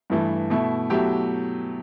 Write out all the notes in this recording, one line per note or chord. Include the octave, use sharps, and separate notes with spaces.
G2 E3 A3
B2 A3 E4
B2 F#3 A3 E4 G4